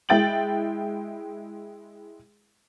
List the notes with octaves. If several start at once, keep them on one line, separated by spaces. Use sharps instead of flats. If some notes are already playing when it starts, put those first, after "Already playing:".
G#3 E4 G5 A6 D7 F#7